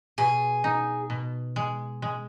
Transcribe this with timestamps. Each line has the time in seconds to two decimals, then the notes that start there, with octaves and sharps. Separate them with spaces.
0.18 B2 G#4
0.64 D#4
1.10 B2
1.56 G#3
2.02 G#3